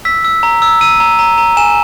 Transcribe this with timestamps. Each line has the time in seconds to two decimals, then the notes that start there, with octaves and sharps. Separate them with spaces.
0.05 E6 B6
0.25 E6
0.43 A#5
0.62 E6
0.81 E6 D#7
1.00 A#5
1.19 A#5
1.38 A#5
1.57 G#5 E7